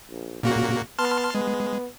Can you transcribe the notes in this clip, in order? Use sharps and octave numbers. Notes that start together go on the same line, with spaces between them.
A#1
A#2 C#3 A#3 F#4
B3 A5 C6 F6
G#3 B3